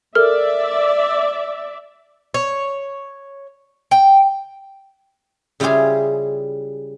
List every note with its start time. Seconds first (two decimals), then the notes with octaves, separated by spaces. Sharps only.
0.15 A4 A#4 D5 E5 F6
2.34 C#5
3.91 G5
5.60 C#3 G3 E4 F4 G4 G#4